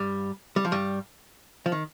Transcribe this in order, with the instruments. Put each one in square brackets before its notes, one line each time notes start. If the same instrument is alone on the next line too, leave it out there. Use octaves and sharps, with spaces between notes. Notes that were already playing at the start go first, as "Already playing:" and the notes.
Already playing: [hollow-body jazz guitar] G2 G3
G3
F3
G2 G3
F3
D#3